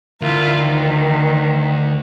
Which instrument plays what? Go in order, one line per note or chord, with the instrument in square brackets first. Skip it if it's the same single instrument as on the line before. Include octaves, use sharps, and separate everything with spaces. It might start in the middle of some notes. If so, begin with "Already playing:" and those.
[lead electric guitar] D2 [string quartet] E4 F4 A#4
[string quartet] D#3